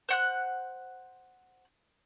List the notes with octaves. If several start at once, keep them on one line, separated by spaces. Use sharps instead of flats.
C5 F#5 F#6